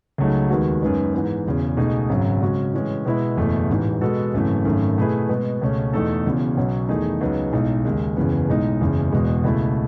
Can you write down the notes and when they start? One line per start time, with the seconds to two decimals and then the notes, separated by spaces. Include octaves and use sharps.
0.18 C#2 C#3 F#3 A3 D#4
0.50 D#2 D#3 G#3 B3 F#4
0.82 F#2 D#3 G#3 B3
1.14 G#2 E3 B3
1.46 E1 E2 C#3
1.77 C#2 B2 A3 D#4 G#4
2.09 G#1 F#2 C#3 F#3
2.41 C#3 G#3 C#4 F#4
2.74 A2 E3 G#3 C#4
3.05 B2 G#3 B3 E4
3.37 F#1 E2 B2 A3 E4
3.69 A1 G#2 E3
4.01 B2 G#3 B3 F#4 A4
4.33 G#1 F#2 C#3 E3 A3
4.65 G#1 F#2 D#3 A3
4.97 B2 A3 E4 G#4 B4
5.29 B2 G#3 B3
5.61 C#2 B2 A3 C#4
5.93 E2 B2 A3 D#4 A4
6.26 E1 E2 C#3
6.57 B1 B2 F#3 C#4
6.89 E2 D#3 A3 D#4 G#4
7.21 C#2 C#3 F#3 B3 D#4
7.53 B1 A2 G#3 D#4
7.85 D#2 C#3 G#3
8.16 F#1 E2 C#3 E3 B3
8.49 B1 A2 G#3 D#4
8.81 F#1 E2 C#3
9.12 E1 E2 B2 G#3 B3
9.44 C#2 B2 A3 E4